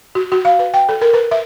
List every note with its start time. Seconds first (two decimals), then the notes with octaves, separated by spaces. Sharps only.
0.15 F#4
0.32 F#4
0.45 F5
0.59 B4
0.74 G5
0.89 A4
1.01 A#4
1.14 B4
1.31 E5